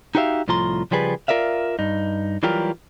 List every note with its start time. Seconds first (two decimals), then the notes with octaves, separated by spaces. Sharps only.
0.15 D#4 F#4 G4 C5 E5 F5
0.48 C2 A2 F3 F4 A#5 C6
0.91 C#3 F3 G3 G#4 B4
1.28 F4 A#4 D5 E5 F5
1.79 G2 D#4
2.43 E3 F#3 G3 F4 G4 A#4